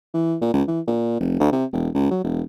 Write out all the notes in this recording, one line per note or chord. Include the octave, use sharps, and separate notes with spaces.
E3
A#2
C#2
E3
A#2
F1
D2
C3
E1
C#2
F#3
E1